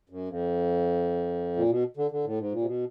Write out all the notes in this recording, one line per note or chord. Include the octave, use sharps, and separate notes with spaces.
F#2
F2
A#2
B2
D3
D3
A2
G#2
A#2
C3
B2